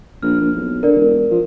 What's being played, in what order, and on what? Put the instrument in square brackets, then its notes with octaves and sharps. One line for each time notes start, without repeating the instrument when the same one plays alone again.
[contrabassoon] A#1 [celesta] F6
[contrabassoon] A#1
B1
[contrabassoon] D3 [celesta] A#4 D5
[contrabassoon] E1
F3